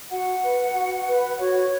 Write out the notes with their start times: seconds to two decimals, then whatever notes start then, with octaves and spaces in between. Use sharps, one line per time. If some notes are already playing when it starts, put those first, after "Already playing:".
0.10 F#4 F#5
0.42 B4
0.74 F#4
1.07 B4
1.39 F#4 C#5